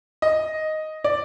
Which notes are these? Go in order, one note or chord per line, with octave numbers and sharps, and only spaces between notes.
D#5
D5